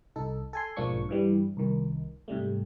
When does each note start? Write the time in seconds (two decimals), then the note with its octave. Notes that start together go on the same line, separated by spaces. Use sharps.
0.16 C2 D#4 A4
0.53 A4 G#5 C6
0.77 B1 G#2 F3 A#3 D4 C#6
1.09 G2 E3 G3
1.57 C2 D#3
2.28 G#2 C3 G3 A3